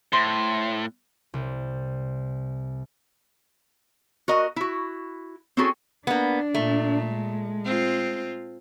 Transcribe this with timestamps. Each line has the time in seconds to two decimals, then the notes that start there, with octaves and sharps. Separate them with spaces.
0.13 A2 C5 C6
1.34 C2
4.28 F#4 A#4 D#5
4.56 E4 F#4
5.57 C4 C#4 E4 F#4 G#4 A4
6.07 A#3 B3 D4
6.55 A#2 A3
7.07 G#3
7.66 C4 F4